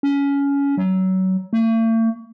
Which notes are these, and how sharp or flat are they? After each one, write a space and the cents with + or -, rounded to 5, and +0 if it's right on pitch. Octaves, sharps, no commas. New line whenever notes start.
C#4 +20
F#3 +25
A3 +45